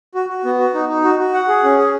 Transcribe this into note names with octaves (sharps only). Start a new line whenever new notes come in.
F#4
F#4
B3
F#4
D#4
D#4
F#4
F#4
F#5
G#4
C#4
G#4